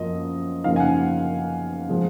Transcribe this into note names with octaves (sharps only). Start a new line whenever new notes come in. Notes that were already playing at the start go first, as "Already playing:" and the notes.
Already playing: F#2 F3 A#3 D#5
F#2 C#3 F3 A#3 D#4 F5
G#5
F#5
F3 G#3